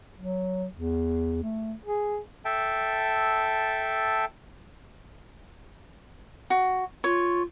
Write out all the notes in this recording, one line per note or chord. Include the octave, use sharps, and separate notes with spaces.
F#3
E2
A3
G#4
A4 E5 G5 A5
F#4
F4 C#5